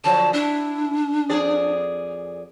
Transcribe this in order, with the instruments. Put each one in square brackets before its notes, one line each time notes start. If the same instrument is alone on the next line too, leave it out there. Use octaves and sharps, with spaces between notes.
[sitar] D3 F3 F#3 [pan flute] A5
[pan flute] D4 [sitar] E4
[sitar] F2 G#4 D5